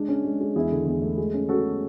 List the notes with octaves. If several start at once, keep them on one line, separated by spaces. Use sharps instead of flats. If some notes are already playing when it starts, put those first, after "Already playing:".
Already playing: G#3 D4
C#4
G#3
G#3
E2 E4 G#4
D3
E2
A3
G#3
C#4
C#4 F#4 A4